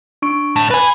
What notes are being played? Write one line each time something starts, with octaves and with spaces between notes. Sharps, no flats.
D4 C#6 D7
A2
B4 G#5 B5